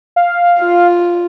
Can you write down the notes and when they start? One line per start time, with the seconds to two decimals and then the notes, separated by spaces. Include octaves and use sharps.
0.16 F5
0.60 F4